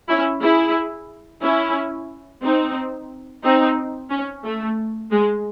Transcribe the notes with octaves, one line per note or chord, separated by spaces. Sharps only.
C#4 E4
E4 G#4
C#4 E4
C4 D#4
C4 D#4
C#4
A3
G#3